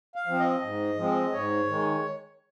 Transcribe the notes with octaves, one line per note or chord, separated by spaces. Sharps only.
F5
F3 C4
D#5
G#2
F3 G#3 C4
G#2 C#5
D#3 G#3